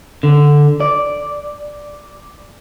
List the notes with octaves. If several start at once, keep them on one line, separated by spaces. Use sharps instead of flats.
D3
D5